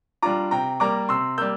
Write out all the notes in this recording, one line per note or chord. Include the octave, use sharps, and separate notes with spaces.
G3 D4 F4 A#5 D6
C3 G5 A#5
G3 A#3 A#5 D6
C3 C6 E6
G3 A#3 E6 G6